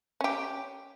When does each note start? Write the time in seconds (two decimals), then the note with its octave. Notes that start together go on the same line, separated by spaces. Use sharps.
0.21 C#4 G4